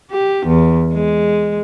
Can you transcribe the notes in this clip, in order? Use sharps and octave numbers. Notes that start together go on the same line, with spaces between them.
G4
E2
G#3